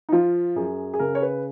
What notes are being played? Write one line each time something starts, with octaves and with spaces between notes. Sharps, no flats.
D#4
F3 F4
F#2 G#4
G#4
C#3 A#4
C#5
B4